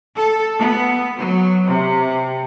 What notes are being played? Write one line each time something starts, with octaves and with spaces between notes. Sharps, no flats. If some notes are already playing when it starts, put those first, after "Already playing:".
A4
B3
F#3
C3